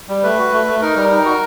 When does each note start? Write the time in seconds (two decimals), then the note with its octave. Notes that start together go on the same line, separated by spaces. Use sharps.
0.09 G3
0.23 A3 B4
0.38 F#4
0.52 A3
0.67 A3
0.82 D#4 A#4
0.96 G3
1.11 D#4
1.25 F#4